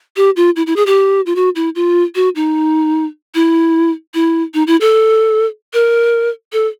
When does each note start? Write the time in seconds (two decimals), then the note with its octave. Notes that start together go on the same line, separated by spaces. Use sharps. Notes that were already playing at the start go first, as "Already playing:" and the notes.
0.16 G4
0.36 F4
0.56 E4
0.67 E4
0.76 G#4
0.86 G4
1.26 F4
1.36 F#4
1.55 E4
1.75 F4
2.15 F#4
2.36 D#4
3.35 E4
4.14 E4
4.54 D#4
4.67 E4
4.81 A4
5.74 A#4
6.53 A4